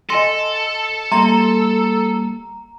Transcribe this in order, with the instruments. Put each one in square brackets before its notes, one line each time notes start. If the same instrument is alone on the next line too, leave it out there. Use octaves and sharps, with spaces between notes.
[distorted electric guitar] A4 [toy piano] D#5 G#5 C6 [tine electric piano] A#6
[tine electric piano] G3 A#3 [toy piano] E5 C6 [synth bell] A#5